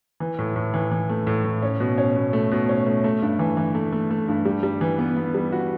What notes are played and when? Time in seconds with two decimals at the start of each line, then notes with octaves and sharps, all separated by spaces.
0.20 E3
0.39 A2
0.56 A2
0.74 E3
0.91 E3
1.09 A3
1.27 A2
1.44 A2
1.62 C#4
1.80 B2
1.98 C#4
2.16 B2
2.33 A3
2.51 B2
2.69 C#4
2.86 A3
3.04 A3
3.22 G2
3.39 E3
3.57 E3
3.75 A3
3.92 A3
4.11 A3
4.28 G2
4.45 G3
4.63 G3
4.81 E3
4.98 B3
5.16 B3
5.34 G3
5.52 F#4